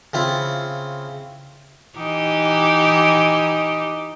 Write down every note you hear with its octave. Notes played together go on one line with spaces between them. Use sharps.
C#3 C4 E4 F4
E3 D#4 G4